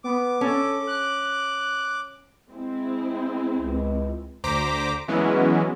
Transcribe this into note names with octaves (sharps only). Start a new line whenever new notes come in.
B3 D6
C#4 A4
F#6
G#3 C4 E4
C#2
D2 C5 A#5 D6 B6
E3 F#3 G#3 B3 C#4 E4